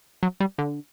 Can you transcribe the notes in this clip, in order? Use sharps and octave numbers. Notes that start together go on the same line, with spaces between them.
F#3
G3
D3